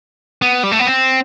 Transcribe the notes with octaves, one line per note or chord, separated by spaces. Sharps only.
B3
G3
A3
B3
C4